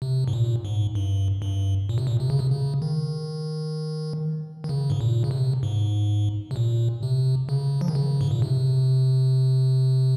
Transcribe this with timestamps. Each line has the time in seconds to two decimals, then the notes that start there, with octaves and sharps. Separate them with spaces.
0.02 C3
0.28 G#2
0.33 A#2
0.65 G#2
0.95 G2
1.42 G2
1.89 A#2
1.98 C3
2.07 A#2
2.20 C3
2.30 C#3
2.39 C3
2.51 C#3
2.82 D#3
4.64 D#3
4.69 C#3
4.90 G#2
5.01 A#2
5.24 C#3
5.31 C3
5.63 G#2
6.51 C3
6.56 A#2
7.03 C3
7.49 C#3
7.81 F3
7.88 D#3
7.95 C#3
8.21 G#2
8.31 A#2
8.42 C3